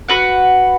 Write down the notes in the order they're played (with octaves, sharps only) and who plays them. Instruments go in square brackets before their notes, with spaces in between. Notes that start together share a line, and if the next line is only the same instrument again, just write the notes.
[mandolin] F#4 B4 F#5